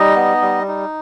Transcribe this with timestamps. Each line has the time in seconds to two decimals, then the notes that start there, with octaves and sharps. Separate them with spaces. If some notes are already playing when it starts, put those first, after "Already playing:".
Already playing: G3 D#4 D#5
0.16 B3
0.42 G3
0.68 D#4